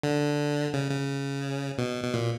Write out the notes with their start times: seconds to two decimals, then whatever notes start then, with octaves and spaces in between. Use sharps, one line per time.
0.03 D3
0.73 C#3
0.91 C#3
1.78 B2
2.04 B2
2.14 A#2